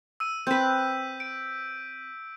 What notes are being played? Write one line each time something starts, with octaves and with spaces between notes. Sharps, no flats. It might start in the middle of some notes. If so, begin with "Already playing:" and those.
E6 D#7
C4 B4 G6 B6
D7